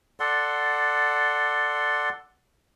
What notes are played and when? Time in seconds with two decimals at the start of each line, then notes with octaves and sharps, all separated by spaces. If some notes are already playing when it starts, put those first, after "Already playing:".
0.20 A4 D5 F#5 C6